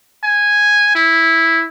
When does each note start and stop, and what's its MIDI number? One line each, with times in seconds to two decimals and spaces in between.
0.23 0.90 80
0.95 1.66 64